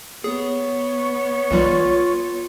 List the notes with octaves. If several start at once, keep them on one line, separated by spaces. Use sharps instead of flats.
B3 G#4 C#5
B1 E3 G3 F4